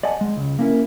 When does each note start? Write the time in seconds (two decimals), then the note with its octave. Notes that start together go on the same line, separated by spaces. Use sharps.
0.03 D5 D#5 F#5 G#5 A5
0.21 G#3
0.36 C#2
0.59 A#3 C#4 E4 A#4